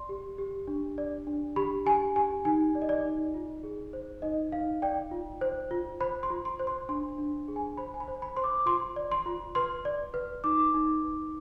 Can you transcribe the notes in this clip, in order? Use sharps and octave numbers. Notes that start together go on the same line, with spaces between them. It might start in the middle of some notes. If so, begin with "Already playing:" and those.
Already playing: D5 C6
G4
G4
D4
D5
D4
G4 B5
G4 G#5
G4 G#5
D#4 G#5
D5
D#5
D5
D#4
F4
G#4
C5
D#4 D#5
D#4 F5
D5 G5
F4
C5
F4
C5 B5
C6
F4
C6
C5
C6
D4 C6
D4
G#4
G#5
C5 B5
G#5
B5
C5
B5
C5 C6
D6
F4 C6
D5
C6
F4
B4 C6
D5
B4
D#4 D6
D#4
B4